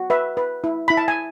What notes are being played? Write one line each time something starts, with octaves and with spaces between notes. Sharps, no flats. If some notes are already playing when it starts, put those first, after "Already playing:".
Already playing: F#4
B4 E5
B4
E4
E4 B5
A5
G#5